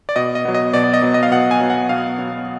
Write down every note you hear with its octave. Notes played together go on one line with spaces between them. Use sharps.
D5
B2 D#5
D#5
F#3 B3
D#5
B2 D5
D5
D#5
F#3 B3
D#5
F5
B2 F#5
G#5
F#3 B3
F#5
B2 F5
F#3 B3